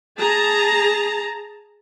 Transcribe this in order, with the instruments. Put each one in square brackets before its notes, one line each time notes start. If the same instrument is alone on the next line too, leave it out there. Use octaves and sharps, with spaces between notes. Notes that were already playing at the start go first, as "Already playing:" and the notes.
[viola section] G#4 A5 A#5